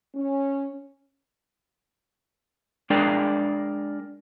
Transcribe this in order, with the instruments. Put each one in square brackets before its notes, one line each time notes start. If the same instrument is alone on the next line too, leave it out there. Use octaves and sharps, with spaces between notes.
[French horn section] C#4
[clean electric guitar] G#3 D4 G#4 A#4 D5 G5